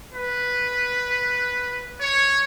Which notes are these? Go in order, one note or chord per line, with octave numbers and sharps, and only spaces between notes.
B4
C#5